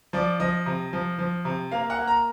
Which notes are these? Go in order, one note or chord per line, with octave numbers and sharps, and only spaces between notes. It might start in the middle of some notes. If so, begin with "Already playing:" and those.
F3 D5
F3 D#5
C3
F3
F3
C3
A#3 F5
F#5
A#3
A#5